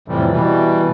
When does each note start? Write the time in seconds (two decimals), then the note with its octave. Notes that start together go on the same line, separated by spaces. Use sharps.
0.08 F2 A2 C3 E3 G3
0.32 B2 E3 G3